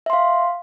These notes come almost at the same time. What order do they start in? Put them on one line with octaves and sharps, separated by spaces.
E5 C6 F5